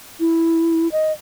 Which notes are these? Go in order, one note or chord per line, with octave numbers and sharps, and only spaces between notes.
E4
D#5